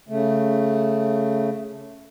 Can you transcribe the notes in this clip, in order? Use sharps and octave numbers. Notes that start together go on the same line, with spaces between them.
C#3 A3